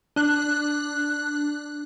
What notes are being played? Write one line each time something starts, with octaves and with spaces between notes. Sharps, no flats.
D4 F#6